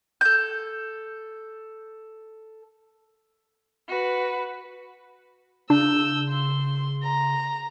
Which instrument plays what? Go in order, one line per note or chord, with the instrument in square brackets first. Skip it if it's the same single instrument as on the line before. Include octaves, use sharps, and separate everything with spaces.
[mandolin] A4 G6
[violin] F#4 B4
[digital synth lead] C#3 [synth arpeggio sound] D4 [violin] E6 G6
[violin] C6
A#5